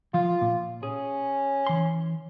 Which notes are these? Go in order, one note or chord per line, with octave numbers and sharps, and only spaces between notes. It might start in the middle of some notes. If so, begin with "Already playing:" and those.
F3 F4
A#2
C#4 G#4
E3 C6